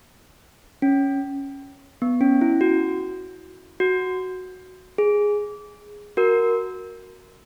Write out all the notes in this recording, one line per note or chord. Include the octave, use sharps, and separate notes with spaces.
C#4
B3
C#4
E4
F#4
F#4
G#4
F#4 A#4